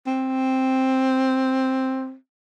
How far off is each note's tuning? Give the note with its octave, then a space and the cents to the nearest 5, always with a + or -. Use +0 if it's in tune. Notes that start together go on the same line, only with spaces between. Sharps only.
C4 +5